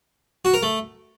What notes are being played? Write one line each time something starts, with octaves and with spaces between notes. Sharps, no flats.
F#4
A#4
A3